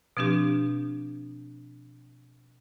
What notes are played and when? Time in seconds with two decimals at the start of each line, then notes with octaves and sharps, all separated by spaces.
0.17 B2 F3 C4 D4 G4